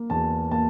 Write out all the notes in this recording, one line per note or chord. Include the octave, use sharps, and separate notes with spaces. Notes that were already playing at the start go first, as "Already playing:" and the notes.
Already playing: A#3
E2 A5
A#3 A5